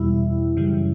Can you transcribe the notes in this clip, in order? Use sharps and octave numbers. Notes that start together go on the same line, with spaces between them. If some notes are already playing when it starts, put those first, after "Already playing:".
Already playing: E2 B2 G3 E4
F#2 C#3 E3 G3